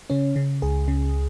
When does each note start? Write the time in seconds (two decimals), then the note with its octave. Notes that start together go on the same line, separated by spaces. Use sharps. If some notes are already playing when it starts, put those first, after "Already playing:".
0.10 C#3 C#4
0.36 C#3
0.62 C#2 G#4
0.88 C#3